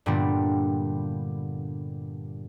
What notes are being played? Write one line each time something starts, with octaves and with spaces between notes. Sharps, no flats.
G2 A#2 D3 G3 B3 D4